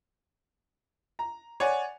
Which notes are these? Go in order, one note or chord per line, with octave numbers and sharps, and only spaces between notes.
A#5
C#5 D5 F#5 G#5